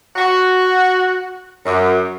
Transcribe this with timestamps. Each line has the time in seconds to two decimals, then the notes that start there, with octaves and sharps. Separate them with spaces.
0.16 F#4
1.66 F#2